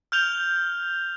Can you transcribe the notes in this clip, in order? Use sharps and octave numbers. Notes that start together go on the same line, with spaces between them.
F6 G6 F7 G7